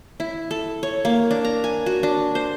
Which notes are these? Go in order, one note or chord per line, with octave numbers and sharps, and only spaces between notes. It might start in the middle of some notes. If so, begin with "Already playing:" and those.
E4
A4
C#5
A#3
D4
A#5
G#5
F#4
D4
C5